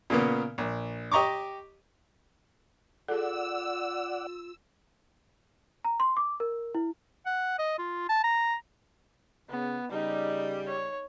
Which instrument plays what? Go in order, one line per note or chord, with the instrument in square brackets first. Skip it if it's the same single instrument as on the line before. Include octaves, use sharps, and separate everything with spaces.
[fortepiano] A#2 C#3 A#3 B3
A#1
G4 D#5 A#5 C#6 D6
[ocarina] F4 [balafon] G#4 A4 [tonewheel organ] D5 F#5 [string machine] E6
[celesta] A#5
C6
D6
A#4
E4
[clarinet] F#5
D#5
F4
A5
A#5
[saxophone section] C#3 [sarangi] B3
[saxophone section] C#3 G3 [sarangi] D#4
[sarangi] C#5